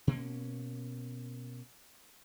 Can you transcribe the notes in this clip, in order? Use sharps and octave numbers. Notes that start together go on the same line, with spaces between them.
B2 A#3 C#4